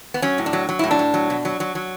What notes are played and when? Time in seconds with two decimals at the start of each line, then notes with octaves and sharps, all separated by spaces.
0.14 B3
0.22 F#3 C#4
0.38 A2
0.46 D4
0.53 F#3
0.69 F#3
0.79 A2 E4
0.91 D4
0.99 A2
1.14 F#3
1.30 B2
1.45 F#3
1.60 F#3
1.75 F#3